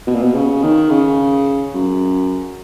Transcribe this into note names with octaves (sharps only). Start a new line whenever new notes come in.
B2
A#2
B2
C#3
D#3
C#3
F#2